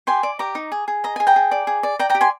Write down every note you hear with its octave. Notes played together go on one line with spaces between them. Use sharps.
G4 G#5 C6
D5
G4 A#5 D6
D#4
G#4
G#4
D#5 A#5
G#4 G#5
G5 A#5
G#4
D5
G#4
D5
D5 G5 A#5
G5 A#5
G4
G#5 C6